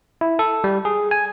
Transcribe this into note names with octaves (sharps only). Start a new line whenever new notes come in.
E4
A4
G3
G#4
G#5